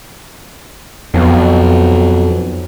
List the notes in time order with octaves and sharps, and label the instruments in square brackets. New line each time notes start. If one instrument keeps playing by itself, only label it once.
[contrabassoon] B1 [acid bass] F2